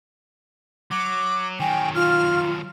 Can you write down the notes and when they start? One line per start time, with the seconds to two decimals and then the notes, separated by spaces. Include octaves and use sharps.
0.91 F#3 D6
1.60 D#3 F#3 G5 G#5
1.95 F4 F6